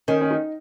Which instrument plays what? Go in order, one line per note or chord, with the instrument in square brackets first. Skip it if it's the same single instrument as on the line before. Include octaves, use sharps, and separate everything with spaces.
[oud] D#3 [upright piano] C#4
[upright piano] C#4
D#4